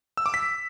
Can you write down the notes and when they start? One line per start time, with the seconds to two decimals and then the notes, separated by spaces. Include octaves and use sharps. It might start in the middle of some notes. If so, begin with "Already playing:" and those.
0.17 E6
0.26 D6
0.34 B6